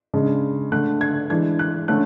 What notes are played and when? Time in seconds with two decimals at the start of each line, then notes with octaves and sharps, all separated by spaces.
0.14 C#3 G#3 D4
0.72 D3 A3 D4 F#6
1.01 G#6
1.30 E3 G#3 D4 G#6
1.59 F#6
1.88 D3 A3 C#4 F#6